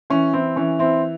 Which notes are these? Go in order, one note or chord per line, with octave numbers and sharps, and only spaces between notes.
E3 C#4
C4 E4
E3 C#4
C4 E4